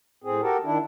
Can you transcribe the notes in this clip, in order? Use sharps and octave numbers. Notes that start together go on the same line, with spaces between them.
A2 C4 G#4
F#4 G4 A4 A#4
D#3 D4 E4